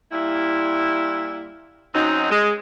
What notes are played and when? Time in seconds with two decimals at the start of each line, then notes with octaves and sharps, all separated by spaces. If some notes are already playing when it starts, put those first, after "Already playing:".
0.12 A#2 G3 E4
1.94 F#2 F#3 C4 D#4
2.30 G#3